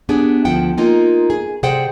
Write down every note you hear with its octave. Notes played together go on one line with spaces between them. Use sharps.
B3 D4 G4 G#4
D2 F3 E4 F#5 G5
G#3 A#3 D#4 F4
G#4
C3 G#4 C5 D5 F#5 G5